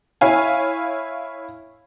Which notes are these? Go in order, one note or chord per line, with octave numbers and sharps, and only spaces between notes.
E4 C#5 F5 G#5